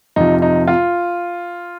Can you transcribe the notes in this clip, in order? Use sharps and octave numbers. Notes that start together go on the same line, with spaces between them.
F2 C3 F3 D#4
D#4
F4